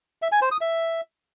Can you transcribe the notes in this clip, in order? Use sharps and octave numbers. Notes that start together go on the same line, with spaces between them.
E5
G#5
C5
D#6
E5